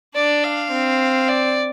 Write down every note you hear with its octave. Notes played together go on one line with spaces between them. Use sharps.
D4 D5
F5
C4
D5